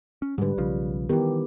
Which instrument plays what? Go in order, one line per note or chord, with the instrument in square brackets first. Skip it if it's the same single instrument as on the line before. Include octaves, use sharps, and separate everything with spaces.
[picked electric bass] C#4
[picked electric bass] G#2 D3 [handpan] G3 B4
[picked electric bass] B1 C#3 F3
[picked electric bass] D#3 E3 [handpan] B3 G4 A#4